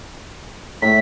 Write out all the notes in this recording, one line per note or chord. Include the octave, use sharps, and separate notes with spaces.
A2 B6